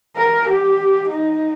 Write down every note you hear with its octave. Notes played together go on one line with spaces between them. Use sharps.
A#4
G4
D#4